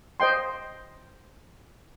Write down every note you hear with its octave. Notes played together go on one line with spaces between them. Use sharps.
C5 D#5 G5 C6